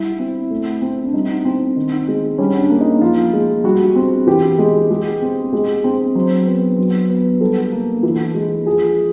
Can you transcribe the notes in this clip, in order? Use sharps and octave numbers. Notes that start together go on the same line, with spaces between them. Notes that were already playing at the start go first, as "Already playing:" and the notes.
Already playing: G3 E4
C4
A3
C4
D4
G3 D#4
C4
D#3
G#3
G3 C#4
D4
A#3
D#4
F3 F4
G#3
G3 F#4
C4
E3 G4
G#3
G#3
C4
G#3
C4
F#3 C5
B3
F#3
B3
G3 A4
A#3
E3
G#3
F3 G#4